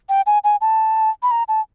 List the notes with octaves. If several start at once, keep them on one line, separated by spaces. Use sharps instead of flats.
G5
G#5
G#5
A5
B5
A#5
A5